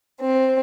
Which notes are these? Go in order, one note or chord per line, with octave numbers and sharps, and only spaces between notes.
C4